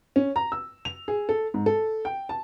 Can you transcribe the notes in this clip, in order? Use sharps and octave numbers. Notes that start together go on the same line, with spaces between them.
C#4
A#5
E6
F7
G#4
A4
G#2
A4
G5
A5